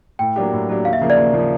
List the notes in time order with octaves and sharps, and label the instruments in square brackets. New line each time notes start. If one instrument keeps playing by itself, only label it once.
[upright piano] A2 [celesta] G5
[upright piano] F#3 A#3 D4 G4
A2
F#3 A#3 D4 G4
[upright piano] D#2 [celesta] F5
[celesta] E5
[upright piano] C#3 F3 A#3
[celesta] D5
[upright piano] D#2
C#3 F3 A#3